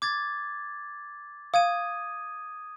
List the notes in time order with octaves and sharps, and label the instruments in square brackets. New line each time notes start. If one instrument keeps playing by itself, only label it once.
[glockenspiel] D6 G#6 A6
[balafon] F5 [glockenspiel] D#6 G#6 D#7